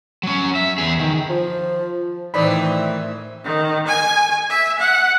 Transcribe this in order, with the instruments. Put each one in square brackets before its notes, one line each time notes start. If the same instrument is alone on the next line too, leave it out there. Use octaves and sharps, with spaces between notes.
[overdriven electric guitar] F#3 C#4
E5
E2 G#4
D#3
[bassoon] F3
[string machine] A2 E5 [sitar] D#3 E3 C4 [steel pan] D5 B5
[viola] D#3
G#5
E5
F#5